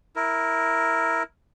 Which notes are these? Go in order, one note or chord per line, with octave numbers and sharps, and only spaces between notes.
E4 A#4